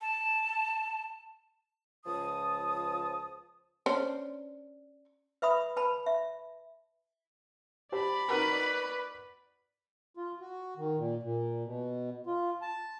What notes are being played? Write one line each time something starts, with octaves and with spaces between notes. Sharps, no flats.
A5
C#2 F3 A5 D#6
C#4 D4 C5
B4 E5 B5 D#6
B4 A5 B5
E5
G4 C5 D5 A5 B5
D#4 F#4 A#4 B4
F4
F#4
D#3
A#2
A#2
B2
F4
A5